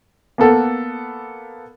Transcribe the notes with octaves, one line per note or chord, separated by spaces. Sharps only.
A#3 B3 A4 F#5